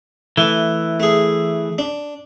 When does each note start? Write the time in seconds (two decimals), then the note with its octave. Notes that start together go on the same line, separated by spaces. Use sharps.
0.37 E3 A3
1.00 A3 G#4
1.78 D4